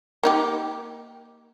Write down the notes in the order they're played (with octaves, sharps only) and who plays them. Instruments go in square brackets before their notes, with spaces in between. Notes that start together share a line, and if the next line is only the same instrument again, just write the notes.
[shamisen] A#3 D#4 G4